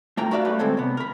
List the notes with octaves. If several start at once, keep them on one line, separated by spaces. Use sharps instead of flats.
A3 F4 A#4 G5 A#5
F#4 A#4 B4 D5 E5 F5
G3 A3 B4
D#3 G#3 C4 A4 C#5
C3 B3
A#4 B5